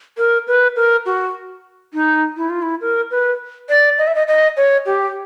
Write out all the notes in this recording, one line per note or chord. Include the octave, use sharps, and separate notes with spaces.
A#4
B4
A#4
F#4
D#4
E4
F4
E4
A#4
B4
D5
D#5
E5
D#5
D#5
C#5
G4